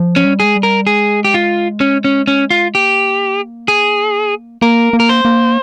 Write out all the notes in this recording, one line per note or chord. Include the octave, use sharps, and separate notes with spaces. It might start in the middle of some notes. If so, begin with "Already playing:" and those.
Already playing: F3
C#4
G3
G#3 G#4
G3
A#4
G#3 G#4
G4
F4
C#4
C#4
C#4
F4
A#3 G4
G#4
A#3 A#4
A#3
A#4
C5
A#3